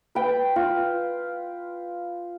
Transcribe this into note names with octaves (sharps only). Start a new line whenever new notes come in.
B4 G5
F4